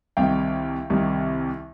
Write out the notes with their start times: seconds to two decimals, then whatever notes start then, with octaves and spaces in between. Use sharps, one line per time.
0.17 C2 C3 D#3 F5 G5
0.90 C2 C3 D#3